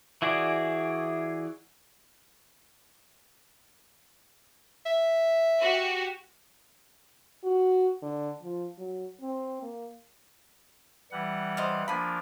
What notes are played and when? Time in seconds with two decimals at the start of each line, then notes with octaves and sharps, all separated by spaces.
0.22 E3 E4 F#4 G#4 D5
4.86 E5
5.61 F#4 G4
7.44 F#4
8.02 D3
8.42 F3
8.78 F#3
9.21 C4
9.62 A#3
11.12 E3 G3 F#5
11.57 C5 D#5 F5
11.88 F3 A#3 D4 G#5 B5